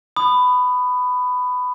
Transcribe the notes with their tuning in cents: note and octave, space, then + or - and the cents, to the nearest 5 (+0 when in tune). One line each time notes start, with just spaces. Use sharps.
B5 +15 D#6 -25